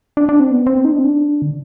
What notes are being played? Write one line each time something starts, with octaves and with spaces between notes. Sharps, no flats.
D4
D4
C4
B3
C4
D#4
D4
C4
D4
D3